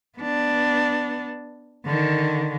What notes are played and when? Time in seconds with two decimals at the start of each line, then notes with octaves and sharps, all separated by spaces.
0.18 B3 D4
1.86 D3 D#3